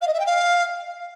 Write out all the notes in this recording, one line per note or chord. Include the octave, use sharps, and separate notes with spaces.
F5
D#5
E5
G5
F5